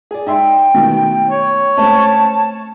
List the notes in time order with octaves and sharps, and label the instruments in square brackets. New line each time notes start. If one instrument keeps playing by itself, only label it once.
[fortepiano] G#4 D5
[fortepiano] D#4 E5 C6 [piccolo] G5
[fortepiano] B2 D#3 A3
[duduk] C#5
[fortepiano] A3 C4 C#4 [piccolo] A5